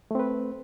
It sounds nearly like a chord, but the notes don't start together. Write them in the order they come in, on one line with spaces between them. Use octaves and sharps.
A3 C4 B4